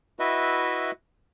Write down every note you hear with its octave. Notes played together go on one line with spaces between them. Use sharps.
E4 F#4 B4 D#5 E5